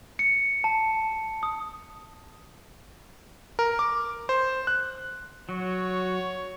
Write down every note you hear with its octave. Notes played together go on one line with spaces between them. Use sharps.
C#7
A5
D#6
A#4
D6
C5
F#6
F#3 F#4 C#5